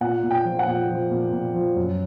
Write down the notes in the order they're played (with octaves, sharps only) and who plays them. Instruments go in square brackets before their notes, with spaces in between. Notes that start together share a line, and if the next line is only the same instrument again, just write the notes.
[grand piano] A#2 F#5
A#2
G5
F3
F#5
A#2
F3
A#2
A#2
F3
F#2